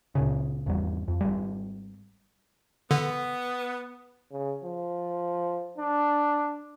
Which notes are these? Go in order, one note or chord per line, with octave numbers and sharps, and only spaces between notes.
C#2 A#2 C#3
G#1 E2 G3
F2
G#1 G3
D3 B3
C#3
F3
D4